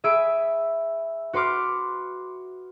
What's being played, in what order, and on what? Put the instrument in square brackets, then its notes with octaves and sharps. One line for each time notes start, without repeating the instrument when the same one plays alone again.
[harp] G#4 E5 B5 E6 D7 E7
F#4 B4 C6 D6 F6